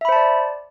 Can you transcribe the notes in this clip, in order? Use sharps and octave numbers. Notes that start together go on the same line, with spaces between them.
C5 D5 E5 A5 B5